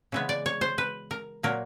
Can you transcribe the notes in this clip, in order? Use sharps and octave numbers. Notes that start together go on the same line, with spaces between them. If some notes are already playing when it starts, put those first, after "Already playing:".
C#3 E3 G#3 B3
D5
C#5
C5
B4
A#4
A#2 F#3 A#3 A#4